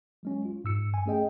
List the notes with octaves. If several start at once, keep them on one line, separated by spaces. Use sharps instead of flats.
F#3 G#3 C#4
F4
G#2 E6 C#7
G2 G#5
A3 C#4 G#4 D#5 G5